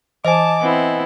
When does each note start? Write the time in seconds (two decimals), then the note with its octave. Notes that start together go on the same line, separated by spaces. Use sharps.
0.25 E3 C5 D#5 G#5 A5 D6
0.62 B3 C4 E4